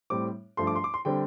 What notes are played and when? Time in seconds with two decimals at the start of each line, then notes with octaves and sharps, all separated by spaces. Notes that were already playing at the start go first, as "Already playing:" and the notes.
0.10 A2 G3 C4 D6
0.57 G2 F3 A3 C6
0.67 D6
0.76 C6
0.84 D6
0.94 C6
1.05 D3 G3 C4 G5